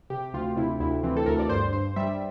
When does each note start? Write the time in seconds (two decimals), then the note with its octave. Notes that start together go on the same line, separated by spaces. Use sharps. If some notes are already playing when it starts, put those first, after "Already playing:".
0.10 C3 G4
0.34 D2 F4
0.56 C3 E4
0.80 D2 E4
1.03 E3 C4
1.17 A4
1.26 D2 A#4
1.39 D5
1.49 G2 C5
1.73 G2 C5
1.96 G3 E5